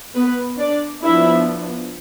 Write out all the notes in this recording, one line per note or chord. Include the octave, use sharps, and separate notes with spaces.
B3 B4
D4 D5
F3 B3 D4 E4 E5